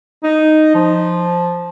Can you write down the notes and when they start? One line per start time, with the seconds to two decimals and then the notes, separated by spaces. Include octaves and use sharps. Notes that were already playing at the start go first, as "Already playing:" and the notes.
0.24 D#4
0.75 F3